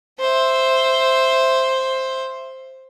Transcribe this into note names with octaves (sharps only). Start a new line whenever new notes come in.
C5 E5